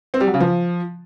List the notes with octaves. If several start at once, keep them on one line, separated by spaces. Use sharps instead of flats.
C4
G3
F#3
C#3
F3